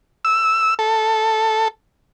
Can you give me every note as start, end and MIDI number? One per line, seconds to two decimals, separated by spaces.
0.25 0.74 88
0.79 1.68 69